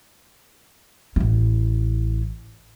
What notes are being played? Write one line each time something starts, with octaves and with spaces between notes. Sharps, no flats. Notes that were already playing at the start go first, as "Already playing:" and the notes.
A1 E4